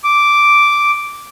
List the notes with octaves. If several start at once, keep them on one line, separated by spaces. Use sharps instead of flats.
D6